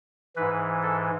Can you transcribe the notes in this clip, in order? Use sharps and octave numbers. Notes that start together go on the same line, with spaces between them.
G#2 E3 B4
A4